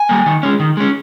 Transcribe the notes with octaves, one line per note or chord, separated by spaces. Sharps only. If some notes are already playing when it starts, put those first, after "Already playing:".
Already playing: G#5
G3 A#3
D#3
G#3 C#4
D#3
G#3 C#4